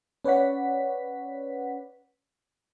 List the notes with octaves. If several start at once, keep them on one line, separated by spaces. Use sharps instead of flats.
C#4 B4 C#5 D5 F#5 B6